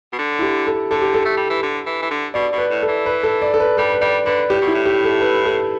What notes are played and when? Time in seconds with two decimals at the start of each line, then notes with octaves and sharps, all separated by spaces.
0.13 B2
0.19 D3
0.39 E4
0.42 G4
0.67 A4
0.91 D3 A4
1.02 G4
1.14 A4
1.25 A3
1.37 G3
1.50 E3
1.63 D3
1.86 E3
2.02 E3
2.11 D3
2.34 B2 D5
2.53 B2
2.58 B4
2.70 A2
2.83 A4
2.88 E3
3.06 B4
3.23 A4
3.42 D5
3.54 A4
3.60 B4
3.78 G3 A4
3.92 B4
4.01 G3 D5
4.26 D3 B4
4.50 A2 G4
4.61 B2
4.68 E4
4.75 A2
4.86 G4
5.04 A4
5.21 B4
5.46 A4